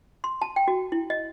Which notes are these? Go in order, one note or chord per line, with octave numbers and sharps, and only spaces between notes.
C6
A5
G5
F#4
E4
D#5